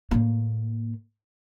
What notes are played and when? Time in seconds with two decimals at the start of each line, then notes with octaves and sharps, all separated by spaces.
0.11 A2 A#3